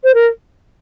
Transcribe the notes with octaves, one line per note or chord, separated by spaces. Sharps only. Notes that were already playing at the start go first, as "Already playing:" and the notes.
C5
A#4